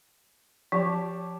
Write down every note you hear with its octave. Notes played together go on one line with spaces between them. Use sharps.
F3 G4 C#5 A5